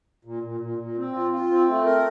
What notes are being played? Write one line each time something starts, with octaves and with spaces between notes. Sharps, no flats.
A#2
A#2
A#2
A#2
C4
F4
F4
C4
A3
A#4